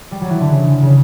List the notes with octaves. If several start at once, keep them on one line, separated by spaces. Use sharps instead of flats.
G3
F#3
E3
D3
C#3
C#3